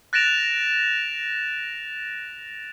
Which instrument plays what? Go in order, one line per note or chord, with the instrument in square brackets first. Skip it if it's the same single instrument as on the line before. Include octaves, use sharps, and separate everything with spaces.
[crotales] F#6 A6 A#6 D7 E7 F7